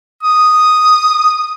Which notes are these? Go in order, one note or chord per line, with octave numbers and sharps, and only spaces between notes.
D#6